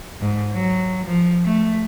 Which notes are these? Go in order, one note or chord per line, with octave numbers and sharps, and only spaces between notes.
G#2
F#3
F3
A3